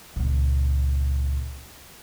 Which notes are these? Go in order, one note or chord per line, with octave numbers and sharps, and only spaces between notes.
C#2 A#2